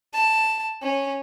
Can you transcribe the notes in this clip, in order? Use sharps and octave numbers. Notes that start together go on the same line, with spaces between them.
A5
C#4